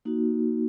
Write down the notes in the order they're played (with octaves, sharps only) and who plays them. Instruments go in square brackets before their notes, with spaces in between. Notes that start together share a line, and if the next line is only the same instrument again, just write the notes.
[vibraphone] A#3 D#4 F#4